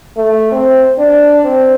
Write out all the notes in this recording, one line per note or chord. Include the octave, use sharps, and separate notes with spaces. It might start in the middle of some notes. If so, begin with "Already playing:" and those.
A3
C4
D4
C4